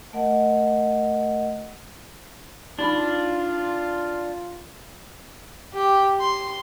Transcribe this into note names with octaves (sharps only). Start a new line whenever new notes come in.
A3 A#4 D#5 F#5
D4 D#4 F4 F#4 B5
G4
C6